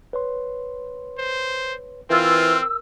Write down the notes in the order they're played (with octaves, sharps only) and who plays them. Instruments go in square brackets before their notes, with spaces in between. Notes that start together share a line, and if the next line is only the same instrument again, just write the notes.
[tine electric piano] B4 C#5 C6
[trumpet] C5
[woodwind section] E3 F4 [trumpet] C4 [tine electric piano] A#4 [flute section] E6